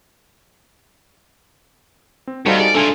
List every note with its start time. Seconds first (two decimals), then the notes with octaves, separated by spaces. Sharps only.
2.27 C4
2.46 G2 G3 D#4 F#4 A4 C5 F5
2.60 G#4 D5
2.75 A3 D4 F4 A4 G#5